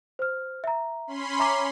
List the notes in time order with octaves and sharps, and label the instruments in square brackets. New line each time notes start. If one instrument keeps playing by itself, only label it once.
[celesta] C5 F6
E5 A#5
[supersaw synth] C#4 B5 C6
[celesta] E5 A#5 D6